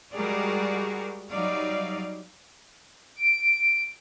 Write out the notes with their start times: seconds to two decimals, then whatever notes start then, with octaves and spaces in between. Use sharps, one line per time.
0.14 G3 G#3 F#4 G#4 A#4 D5
1.28 F#3 G3 D#4 D5 F5
3.16 D7